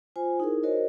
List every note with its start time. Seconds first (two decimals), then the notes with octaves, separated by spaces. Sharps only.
0.16 F4 C5 G#5
0.40 D#4 E4 G#4 A#4
0.63 F#4 A#4 C5 C#5 D#5